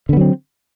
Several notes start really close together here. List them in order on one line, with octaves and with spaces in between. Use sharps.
D3 B3 F#3 C4